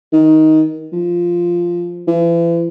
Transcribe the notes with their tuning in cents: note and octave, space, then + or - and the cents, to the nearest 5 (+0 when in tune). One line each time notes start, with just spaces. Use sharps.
D#3 +10
F3 -5
E3 +40